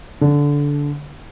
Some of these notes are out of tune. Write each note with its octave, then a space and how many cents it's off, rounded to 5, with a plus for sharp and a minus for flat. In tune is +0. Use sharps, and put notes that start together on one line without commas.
D3 -15